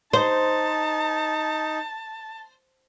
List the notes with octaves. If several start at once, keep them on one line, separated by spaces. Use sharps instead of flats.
D#4 C5 A5